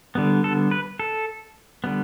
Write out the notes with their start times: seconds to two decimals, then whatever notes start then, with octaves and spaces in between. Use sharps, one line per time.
0.15 D3 G3 B3
0.44 A4
0.71 B4
0.99 A4
1.84 D3 G3 B3